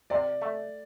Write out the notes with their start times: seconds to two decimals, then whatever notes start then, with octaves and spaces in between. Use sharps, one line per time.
0.10 C3 D5
0.42 A3